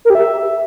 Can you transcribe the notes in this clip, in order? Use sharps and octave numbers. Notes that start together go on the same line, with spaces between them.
A#4
G4
E5